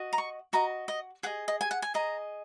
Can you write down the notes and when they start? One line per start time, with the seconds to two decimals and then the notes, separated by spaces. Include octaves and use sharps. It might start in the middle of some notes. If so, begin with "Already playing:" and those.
Already playing: F#4 D#5
0.13 A#5
0.18 C#6
0.53 F#4 D#5 A#5
0.88 D#5
1.23 G#4 D#5 F#5
1.48 D#5
1.61 G#5
1.71 F#5
1.82 G#5
1.94 G#4 D#5 A#5